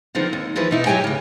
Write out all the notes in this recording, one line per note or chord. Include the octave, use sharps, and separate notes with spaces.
D3 D#3 F3 B3 C4
D#2
D#2 E3 F3 B4
B2 D#4 E4
F#3 G4 C#5 G5 G#5
A2 C#3